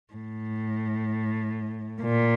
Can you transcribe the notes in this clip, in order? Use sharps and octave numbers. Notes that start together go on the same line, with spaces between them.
A2
A#2